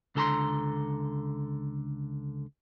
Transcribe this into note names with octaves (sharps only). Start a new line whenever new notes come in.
C#2 D3 A4 A5 A#5 C6